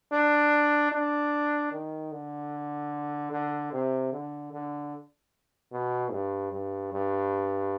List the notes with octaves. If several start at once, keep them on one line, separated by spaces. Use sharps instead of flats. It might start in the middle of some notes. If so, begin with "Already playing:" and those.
D4
D4
D#3
D3
D3
C3
D3
D3
B2
G2
G2
G2